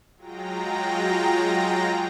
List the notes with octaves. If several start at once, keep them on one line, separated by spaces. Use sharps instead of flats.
F#3 G#3 F4 G5 A#5 A#6